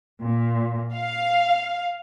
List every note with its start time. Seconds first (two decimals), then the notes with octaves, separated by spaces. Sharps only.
0.22 A#2
0.95 F5